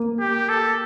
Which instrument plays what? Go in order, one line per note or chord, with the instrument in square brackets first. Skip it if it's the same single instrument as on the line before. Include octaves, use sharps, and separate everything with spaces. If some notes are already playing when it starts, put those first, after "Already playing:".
Already playing: [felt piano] A#3
[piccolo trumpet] G4
A4